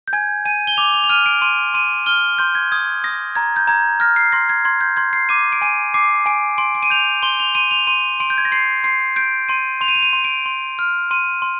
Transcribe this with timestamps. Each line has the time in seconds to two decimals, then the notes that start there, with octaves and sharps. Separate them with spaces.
0.08 G6
0.13 G#5 G#6
0.45 G#5 D#7
0.67 G7
0.77 D6 F7
0.94 F7
1.04 F7
1.09 F6 D#7
1.26 D7
1.42 C6 D#7
1.74 C6 D#7
2.06 F6 G7
2.38 C6 G6
2.55 G#6
2.72 D#6 G#6
3.04 D#6 A#6
3.35 A#5 G#6
3.56 G6
3.68 A#5 G#6
4.00 F6 A#6
4.16 C7
4.32 C6 A#6
4.49 G#6
4.65 C6 G#6
4.81 G6
4.97 C6 G#6
5.13 C7
5.29 D6 D#7
5.52 D7
5.61 G#5 D#7
5.94 D6 C7
6.26 G#5 D7
6.58 C6 D7
6.75 D7
6.83 D#7
6.90 G6 F7
7.23 C6 G7
7.40 F7
7.55 C6 D#7
7.71 F7
7.87 C6 D#7
8.20 C6 D7
8.30 G6
8.38 G#6
8.45 A#6
8.52 C6 C7
8.84 C6 C7
9.16 G6 D7
9.49 C6 D#7
9.81 C6 F7
9.88 D#7
9.96 F7
10.02 D#7
10.13 C6
10.24 D7
10.46 C6
10.79 F6
11.11 C6 D#7
11.42 C6